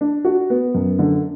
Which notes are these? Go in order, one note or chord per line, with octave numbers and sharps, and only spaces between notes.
D4
F#4
B3
F#2
D3